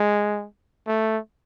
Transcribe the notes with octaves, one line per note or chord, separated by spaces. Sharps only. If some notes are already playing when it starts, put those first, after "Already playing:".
Already playing: G#3
A3